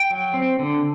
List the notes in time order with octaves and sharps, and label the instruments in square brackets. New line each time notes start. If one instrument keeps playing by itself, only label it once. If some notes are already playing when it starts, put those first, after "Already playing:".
Already playing: [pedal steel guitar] G5
F#3
C4
D3